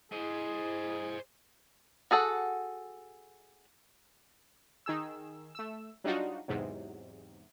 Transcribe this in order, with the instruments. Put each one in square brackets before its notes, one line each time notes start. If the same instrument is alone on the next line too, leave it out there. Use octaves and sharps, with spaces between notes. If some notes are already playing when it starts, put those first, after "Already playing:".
[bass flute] E4 [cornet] G#4 [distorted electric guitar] C5 D#5
[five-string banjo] F#4 G#4 A4 F#5
[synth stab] D#3 G#4 E6
A3 E6
F#3 G3 D4 D#4 F4 F#4
E2 G#2 C3 F#3